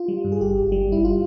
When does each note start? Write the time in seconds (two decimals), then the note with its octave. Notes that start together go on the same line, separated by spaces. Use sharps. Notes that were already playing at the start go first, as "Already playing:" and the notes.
Already playing: F4
0.08 G3
0.24 G2
0.32 G#4
0.41 G1 G4
0.56 G1
0.72 G3
0.89 G1 E4
1.05 F4